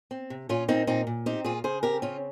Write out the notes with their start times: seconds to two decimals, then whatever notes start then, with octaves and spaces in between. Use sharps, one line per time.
0.11 C4
0.30 C3
0.49 A#2 C#4 F4
0.68 A#3 C4 D#4
0.87 A#2 C4 D#4
1.07 A#2
1.26 C4 D#4 G4
1.44 A#2 F4 G#4
1.64 C#3 G#4 C5
1.83 C4 G4 A#4
2.02 C#3 C#4 F4